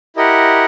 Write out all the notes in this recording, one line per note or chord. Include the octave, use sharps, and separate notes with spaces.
E4 G4 A#4 D#5 F#5